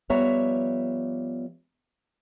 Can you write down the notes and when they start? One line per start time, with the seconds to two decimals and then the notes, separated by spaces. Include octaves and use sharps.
0.10 F3 G3 B3 C#5 E5 A#5